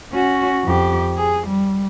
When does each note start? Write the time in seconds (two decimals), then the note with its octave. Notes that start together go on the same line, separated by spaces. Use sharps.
0.12 C#4 F#4
0.65 F2 G4
1.17 G#4
1.47 G3